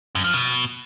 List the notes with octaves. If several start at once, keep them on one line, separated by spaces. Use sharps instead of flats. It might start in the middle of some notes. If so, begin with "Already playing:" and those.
F#2
F3
B2